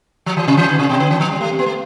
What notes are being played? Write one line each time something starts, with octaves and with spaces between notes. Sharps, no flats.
F3
E3
C3
E3
D3
C3
B2
D3
E3
F3
G3
A3
C4
B3
A3